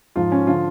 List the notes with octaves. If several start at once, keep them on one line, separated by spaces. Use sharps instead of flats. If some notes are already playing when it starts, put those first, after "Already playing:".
G#2 F3 F4
C#4
D3 F3 F4